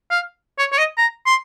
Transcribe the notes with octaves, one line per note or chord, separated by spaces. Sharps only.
F5
C#5
C#5
D#5
A#5
C6